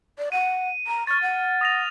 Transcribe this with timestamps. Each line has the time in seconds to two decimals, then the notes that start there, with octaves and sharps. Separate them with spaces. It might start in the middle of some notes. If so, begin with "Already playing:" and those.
0.18 D5
0.32 F#5 D#7
0.87 A#5
1.07 C#6 F6 A6
1.22 F#5
1.61 D#6 A#6 F7